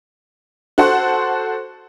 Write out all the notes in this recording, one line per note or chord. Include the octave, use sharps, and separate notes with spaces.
F#4 A4 C5 F#5